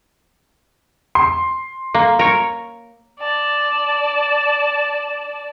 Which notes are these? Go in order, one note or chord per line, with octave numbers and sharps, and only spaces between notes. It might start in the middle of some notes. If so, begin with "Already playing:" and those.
C6
A#3
A#4 C#5
D5 A5